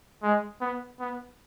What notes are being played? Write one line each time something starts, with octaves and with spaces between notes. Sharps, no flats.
G#3
B3
B3